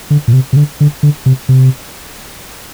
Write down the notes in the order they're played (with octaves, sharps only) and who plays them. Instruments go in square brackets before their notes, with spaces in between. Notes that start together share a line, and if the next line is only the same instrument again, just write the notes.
[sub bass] D3
A#2
C3
C3
D3
D3
D3
C3
C3